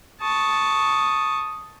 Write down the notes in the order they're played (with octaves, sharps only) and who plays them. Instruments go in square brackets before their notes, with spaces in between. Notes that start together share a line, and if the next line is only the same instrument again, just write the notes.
[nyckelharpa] A5 C#6 [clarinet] D#6